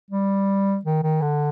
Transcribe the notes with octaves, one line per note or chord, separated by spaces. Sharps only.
G3
D#3
D#3
D3